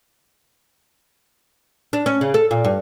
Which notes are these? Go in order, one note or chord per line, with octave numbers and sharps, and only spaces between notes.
D4
C#4
C#3
A4
A#2
G2